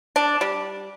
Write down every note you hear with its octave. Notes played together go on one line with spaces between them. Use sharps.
D4
G3